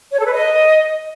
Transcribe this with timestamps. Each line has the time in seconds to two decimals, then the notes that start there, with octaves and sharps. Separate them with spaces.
0.13 C#5
0.19 A4
0.26 B4
0.32 D#5